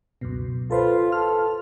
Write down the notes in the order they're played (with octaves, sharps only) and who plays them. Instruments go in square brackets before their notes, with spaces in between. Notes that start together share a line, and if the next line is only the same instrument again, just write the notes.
[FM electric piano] C#2 F#2 B2
[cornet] F4 [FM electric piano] A4 B4 C5
[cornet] A4 [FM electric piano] F6